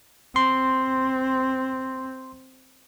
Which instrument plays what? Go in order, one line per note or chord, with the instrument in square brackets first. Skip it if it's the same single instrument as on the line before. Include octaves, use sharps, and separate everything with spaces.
[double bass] C4 [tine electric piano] C6